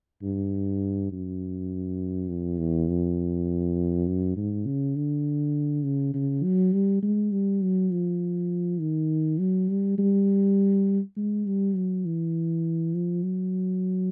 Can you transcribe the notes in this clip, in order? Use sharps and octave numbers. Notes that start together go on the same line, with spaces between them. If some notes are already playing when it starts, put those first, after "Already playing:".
G2
F#2
F2
E2
F2
F#2
G#2
C#3
D3
C#3
C#3
F#3
G3
G#3
G3
F#3
F3
D#3
F#3
G3
G3
G#3
G3
F#3
E3
F3
F#3